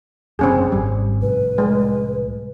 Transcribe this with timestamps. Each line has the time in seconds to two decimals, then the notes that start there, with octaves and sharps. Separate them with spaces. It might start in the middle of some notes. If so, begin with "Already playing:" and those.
0.39 F#1 C2 F#2 C4 C#4 G#4
0.72 G#1 G3
1.22 C2 A2 B4
1.58 G#3